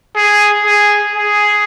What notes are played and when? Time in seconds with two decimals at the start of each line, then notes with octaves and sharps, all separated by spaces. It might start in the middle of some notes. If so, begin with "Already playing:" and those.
0.15 G#4
0.65 G#4
1.16 G#4